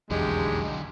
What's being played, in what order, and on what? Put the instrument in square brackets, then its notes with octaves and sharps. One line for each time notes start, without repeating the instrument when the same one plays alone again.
[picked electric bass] F1 B1 E2 [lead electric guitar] D3 F#3 [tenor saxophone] G#3 [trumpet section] D4 G4